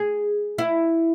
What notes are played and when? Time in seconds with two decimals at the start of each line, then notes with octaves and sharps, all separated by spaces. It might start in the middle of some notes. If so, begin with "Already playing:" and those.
Already playing: G#4
0.58 E4